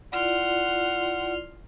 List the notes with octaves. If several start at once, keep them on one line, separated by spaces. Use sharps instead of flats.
E4 F4 D5 F#5 C6 F6